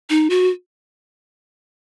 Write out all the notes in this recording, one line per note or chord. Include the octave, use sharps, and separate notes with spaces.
D#4
F#4